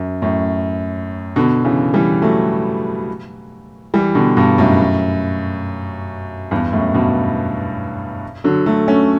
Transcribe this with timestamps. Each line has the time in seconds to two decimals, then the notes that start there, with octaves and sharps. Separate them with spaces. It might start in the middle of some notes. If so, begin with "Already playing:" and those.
Already playing: F#2
0.22 F#2 A2
1.36 B2 D3
1.65 C#3 E3
1.94 E3 G3
2.22 F#3 A3
3.94 E3 G3
4.15 B2 D3
4.37 G2 B2
4.58 F#2 A2
6.51 E2 G2
6.73 F#2 A2
6.94 G2 B2
8.44 D3 F#3
8.66 F#3 A3
8.88 A3 C#4